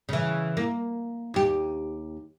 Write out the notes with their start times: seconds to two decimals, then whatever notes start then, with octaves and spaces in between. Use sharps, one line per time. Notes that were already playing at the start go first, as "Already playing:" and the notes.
0.09 C#3 E3
0.57 A#3
1.34 D#2 G4